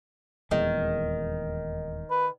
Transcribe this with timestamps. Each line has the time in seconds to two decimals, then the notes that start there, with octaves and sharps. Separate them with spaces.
0.51 D#1 E2 D#3 G#3
2.11 B4